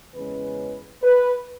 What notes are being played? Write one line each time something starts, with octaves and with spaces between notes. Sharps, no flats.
E2 C#3 G#3 C#4 B4
B4